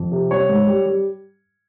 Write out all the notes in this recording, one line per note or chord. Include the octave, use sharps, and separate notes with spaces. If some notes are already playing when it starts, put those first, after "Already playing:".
Already playing: F2
C3
G3 C#5
G#2
G3
G3